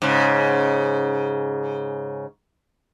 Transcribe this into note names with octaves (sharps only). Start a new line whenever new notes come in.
G#2 C#3